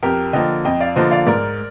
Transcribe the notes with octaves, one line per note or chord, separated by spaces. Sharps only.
F2 G4 A#4
D3 F3 A#3 D#5 G5
F2 D#5 G5
D5 F5
D3 F3 A#3 C5 D#5
D5 F5
G#2 A#4 D5